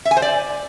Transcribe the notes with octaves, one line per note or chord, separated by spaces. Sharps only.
E5
G#5
C5
D5